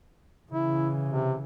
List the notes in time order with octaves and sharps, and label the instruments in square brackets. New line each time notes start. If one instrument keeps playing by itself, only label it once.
[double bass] C#3 E3 [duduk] E4
[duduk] C3